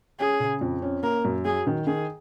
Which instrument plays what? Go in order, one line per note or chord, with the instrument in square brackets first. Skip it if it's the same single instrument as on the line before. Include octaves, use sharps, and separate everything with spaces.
[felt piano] C#4 [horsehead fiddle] G#4
[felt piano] C#3
F2
C#4
[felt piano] A#3 [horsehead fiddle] A#4
[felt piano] F#2
[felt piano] F#3 [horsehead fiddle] G#4
[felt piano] D#3
[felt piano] D#3 [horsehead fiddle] G#4